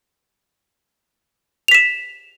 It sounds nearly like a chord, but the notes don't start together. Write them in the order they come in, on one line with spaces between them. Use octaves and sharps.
F7 B6 E7